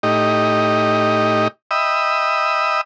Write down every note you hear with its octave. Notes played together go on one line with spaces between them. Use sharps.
A2 D#4 G4 D#5
D#5 E5 G5 B5 D#6 E6